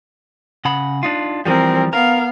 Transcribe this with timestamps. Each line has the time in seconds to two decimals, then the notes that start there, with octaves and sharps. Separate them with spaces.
0.65 C#3 F#5 B5
1.03 D4 D#4 F4
1.46 E3 F3 G3 C4 A#4
1.93 B3 A#4 F5